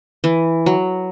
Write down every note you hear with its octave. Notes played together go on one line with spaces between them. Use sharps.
E3
F#3